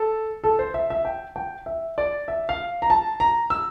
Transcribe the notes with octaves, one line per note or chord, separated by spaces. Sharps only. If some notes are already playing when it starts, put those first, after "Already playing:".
Already playing: A4
A4
C5
E5
E5
G5
G5
E5
D5
E5
F5
A#5
A5
A#5
E6